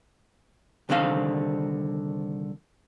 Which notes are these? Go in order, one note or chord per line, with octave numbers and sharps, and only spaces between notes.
C2 D3 D#3 C4 F5